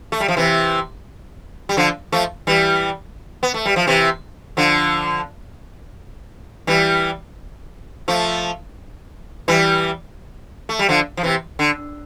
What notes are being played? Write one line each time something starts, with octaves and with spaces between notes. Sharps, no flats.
A3
G3
F3
C3 E3
G3
D3 F3
F3 A3
E3 G3
B3
A3
G3
F3
C3 E3
D3 F3
E3 G3
F3 A3
E3 G3
A3
G3
D3 F3
F3
C3 E3
D3